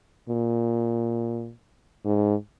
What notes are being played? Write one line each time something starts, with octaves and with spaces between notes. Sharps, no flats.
A#2
G#2